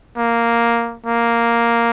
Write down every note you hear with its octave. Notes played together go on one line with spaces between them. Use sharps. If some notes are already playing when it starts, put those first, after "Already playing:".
A#3
A#3